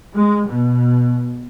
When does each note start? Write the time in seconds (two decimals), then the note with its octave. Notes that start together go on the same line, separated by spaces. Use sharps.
0.14 G#3
0.47 B2